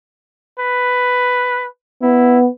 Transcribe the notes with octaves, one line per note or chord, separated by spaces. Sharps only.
B4
B3 E4